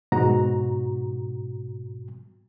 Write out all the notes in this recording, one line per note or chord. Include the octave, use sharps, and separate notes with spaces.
G#2 B2 F#4 A#5